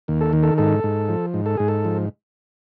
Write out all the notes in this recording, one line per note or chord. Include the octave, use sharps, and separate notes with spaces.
D#2
A4
D#3
A4
G#2 A4
G#2
F3
G#2
A4
G#2 G#4
A4
F3